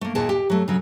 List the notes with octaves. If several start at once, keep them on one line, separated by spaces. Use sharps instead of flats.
A3 A#3
D#2 A#2 G#4 A5
G4
F#3 A3
C#3 F#3